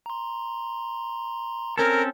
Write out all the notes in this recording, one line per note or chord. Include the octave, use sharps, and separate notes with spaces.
A#5 C6
C4 C#4 A4 A#4